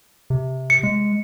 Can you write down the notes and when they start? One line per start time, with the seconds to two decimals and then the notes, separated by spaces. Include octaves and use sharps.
0.30 C3
0.70 C#7
0.83 G#3